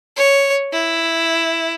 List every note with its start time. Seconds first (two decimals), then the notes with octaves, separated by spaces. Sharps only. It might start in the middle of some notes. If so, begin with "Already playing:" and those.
0.16 C#5
0.72 E4